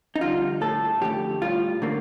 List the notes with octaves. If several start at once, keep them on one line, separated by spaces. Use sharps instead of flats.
D#4
F2 D3 G3 F4
A2 A3 A4
F2 D3 A3 G4
A2 G3 F4
D3 A3 A#3